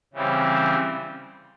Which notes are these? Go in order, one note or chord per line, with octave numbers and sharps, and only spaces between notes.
C#3 E3 G3 C4